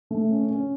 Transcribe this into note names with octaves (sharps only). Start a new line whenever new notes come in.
A3
C#4
C#4